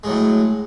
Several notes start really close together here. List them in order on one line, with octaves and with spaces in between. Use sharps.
G#3 A2 F#3